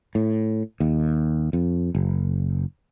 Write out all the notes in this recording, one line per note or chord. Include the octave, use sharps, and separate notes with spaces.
A2
D#2
F2
F#1